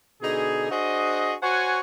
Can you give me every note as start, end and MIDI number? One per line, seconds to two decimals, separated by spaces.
0.22 0.68 47
0.22 0.68 50
0.22 0.68 63
0.22 0.68 68
0.69 1.35 62
0.69 1.35 66
0.69 1.35 68
0.69 1.35 72
0.69 1.35 75
1.42 1.81 66
1.42 1.81 72
1.42 1.81 73
1.42 1.81 78
1.42 1.81 80